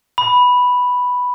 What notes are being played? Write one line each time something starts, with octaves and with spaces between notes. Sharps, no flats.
B5